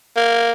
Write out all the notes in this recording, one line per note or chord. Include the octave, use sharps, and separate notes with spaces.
A#3